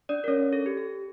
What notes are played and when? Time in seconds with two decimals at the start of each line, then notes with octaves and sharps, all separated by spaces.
0.09 D4 D5
0.24 A#4
0.28 C#4 C#5
0.53 A4
0.66 G4
0.77 A4